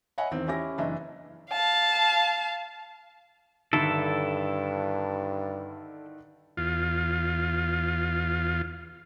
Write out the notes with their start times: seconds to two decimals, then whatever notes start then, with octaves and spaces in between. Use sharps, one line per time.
0.18 C#5 D#5 E5 F#5 G#5 B5
0.31 E2 D#3 C4
0.48 C#4 E4 G4 A#6
0.78 F#1 E3 D4 D#5 E5
1.52 F5 A5
3.73 G2 D3 D#3 E4 A4
6.57 E2 F4